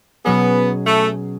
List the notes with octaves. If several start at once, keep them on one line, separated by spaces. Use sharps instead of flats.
B2 F#3 B3 C#4 G#4
A3